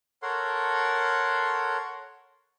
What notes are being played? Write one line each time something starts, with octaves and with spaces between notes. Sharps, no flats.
A4 A#4 C#5 F#5 C6